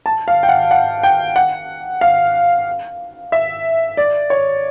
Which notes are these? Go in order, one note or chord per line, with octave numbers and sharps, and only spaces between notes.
A5
F5
G5
F#5
F#5
G5
F#5
F5
E5
D5
C#5